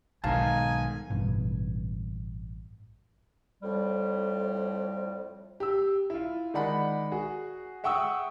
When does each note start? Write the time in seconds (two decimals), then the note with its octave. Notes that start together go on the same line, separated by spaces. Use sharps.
0.24 B1 G#2 D#3 D#4 F5 G#5 A5
1.10 A1 G2 B2
3.63 F2 A2 G3
5.60 G4 E6
6.10 E4 F4
6.54 D#3 G#3 D5 F#5 B5
7.11 F#4 G#4
7.84 E5 F#5 G5 C#6 D#6 E6